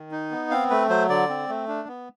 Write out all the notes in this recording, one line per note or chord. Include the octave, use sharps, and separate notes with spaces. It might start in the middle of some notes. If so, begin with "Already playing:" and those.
Already playing: D#3
D#4
B3
C4 F5
A3 B4
F#3 C5
D3 D5
C4
A3
D4
B3